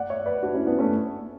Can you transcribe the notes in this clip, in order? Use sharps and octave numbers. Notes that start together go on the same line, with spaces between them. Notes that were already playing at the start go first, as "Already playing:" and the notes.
Already playing: D5 F#5
C#5 E5
B4 D5
D4 F#4
C#4 E4
B3 D4
A3 C#4